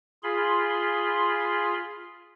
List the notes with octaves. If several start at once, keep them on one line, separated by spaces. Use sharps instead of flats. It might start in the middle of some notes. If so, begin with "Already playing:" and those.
F4 G#4 B5 C6